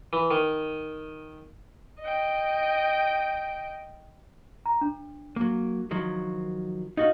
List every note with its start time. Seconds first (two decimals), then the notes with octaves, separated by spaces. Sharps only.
0.13 E3
0.31 D#3
2.00 D#5 G5
4.66 A#5
4.81 D4
5.36 F#3 A#3
5.91 D#3 F3 F#3
6.97 D#4 F#4 D#5 F5